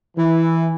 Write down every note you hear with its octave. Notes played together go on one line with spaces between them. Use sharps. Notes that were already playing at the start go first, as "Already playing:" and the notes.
E3